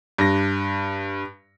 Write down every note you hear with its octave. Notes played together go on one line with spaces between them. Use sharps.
G2 A#6